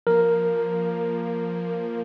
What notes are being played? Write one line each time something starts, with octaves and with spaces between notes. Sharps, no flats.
F3 A#3 A#4